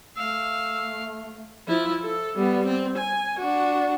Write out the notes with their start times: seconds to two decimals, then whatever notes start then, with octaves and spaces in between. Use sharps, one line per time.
0.17 A3 F5 E6
1.68 F3 E4
2.02 A4
2.36 G3 B3
2.66 C4
2.98 G#5
3.39 D4 F#4